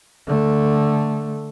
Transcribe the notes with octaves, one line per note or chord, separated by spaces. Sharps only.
D3 A3